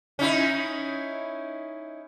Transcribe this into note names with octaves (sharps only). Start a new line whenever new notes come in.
C#4 D#4 E4